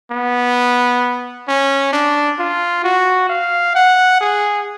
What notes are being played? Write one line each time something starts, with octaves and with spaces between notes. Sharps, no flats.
B3
C#4
D4
F4
F#4
F5
F#5
G#4